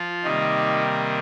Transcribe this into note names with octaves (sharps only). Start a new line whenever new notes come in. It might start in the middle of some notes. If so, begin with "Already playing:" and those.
Already playing: F3 F4
C3 D#3 G3 A#3 D#4